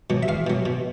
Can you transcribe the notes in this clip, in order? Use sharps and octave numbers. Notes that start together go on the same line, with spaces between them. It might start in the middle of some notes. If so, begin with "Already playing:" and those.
B2 F#3
E5
E2 F5
B2 F#3
B2